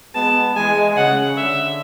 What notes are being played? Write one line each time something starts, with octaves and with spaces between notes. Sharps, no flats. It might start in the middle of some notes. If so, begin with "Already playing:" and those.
G#3 B3 A5
E3 G#3 G#5
C#3 F#5
D3 E5